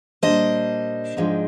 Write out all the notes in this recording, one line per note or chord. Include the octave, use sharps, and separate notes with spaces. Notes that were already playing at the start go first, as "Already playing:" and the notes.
A#2 G3 D4 C5 D#5
G#2 F3 G#3 D4